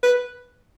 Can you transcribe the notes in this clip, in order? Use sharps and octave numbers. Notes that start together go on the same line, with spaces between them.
B4